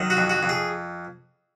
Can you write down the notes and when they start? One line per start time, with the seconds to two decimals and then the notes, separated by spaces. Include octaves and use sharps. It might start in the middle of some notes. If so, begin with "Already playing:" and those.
Already playing: D#3 F#3
0.10 F#4
0.17 F2
0.30 F#4
0.43 F2
0.49 G#4